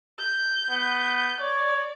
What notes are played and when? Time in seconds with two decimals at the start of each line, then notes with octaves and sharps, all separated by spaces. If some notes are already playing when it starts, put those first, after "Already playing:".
0.19 G6
0.70 B3
1.40 C#5 D5